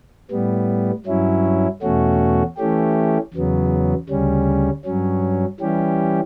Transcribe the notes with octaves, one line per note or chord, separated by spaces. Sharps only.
A2 G3 B3
G2 F#3 C#4 E4
E2 B2 A3 C#4 F#4
E3 A3 C#4 G4
E2 C#3 F#3 B3
D2 C#3 G3 C#4
G2 F#3 C#4
E3 G3 C#4 G4